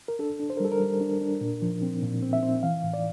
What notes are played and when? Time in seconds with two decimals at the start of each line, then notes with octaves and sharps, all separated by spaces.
0.08 A#4
0.19 D4 A4
0.40 D4
0.50 C5
0.57 A#4
0.60 G3 A4
0.72 A#4
0.80 G3
1.01 D4
1.21 D4
1.41 A#2
1.62 F3
1.82 C4
2.02 A#2
2.22 C4
2.33 E5
2.43 C4
2.63 E3 F5
2.83 A2
2.94 D5